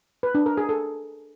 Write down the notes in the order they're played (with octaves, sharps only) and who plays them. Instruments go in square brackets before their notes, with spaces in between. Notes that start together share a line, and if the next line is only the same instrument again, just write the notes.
[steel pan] B4
D4
A#4
G#4
A4